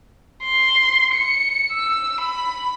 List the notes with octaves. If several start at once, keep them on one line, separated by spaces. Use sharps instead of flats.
C6
C#7
E6
B5